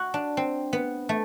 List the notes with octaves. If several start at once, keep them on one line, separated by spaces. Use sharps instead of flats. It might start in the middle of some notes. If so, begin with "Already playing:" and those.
Already playing: F#4
D4
C4
B3
A3